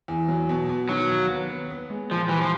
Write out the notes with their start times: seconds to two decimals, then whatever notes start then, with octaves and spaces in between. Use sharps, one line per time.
0.08 E2
0.28 F#3
0.49 B2
0.69 B2
0.89 D#3 F#3
1.09 D#2
1.30 B3
1.50 B3
1.70 B3
1.90 G#3
2.11 A#2 F3
2.29 E3 G3
2.41 F3